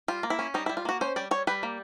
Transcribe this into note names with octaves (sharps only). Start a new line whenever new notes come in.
G3 F4
A#3
E4
C#4
G3 D#4
E4
G3
F4
A#3 F#4
C#4 C5
G3 D5
G3 C#5
G3 B4
A#3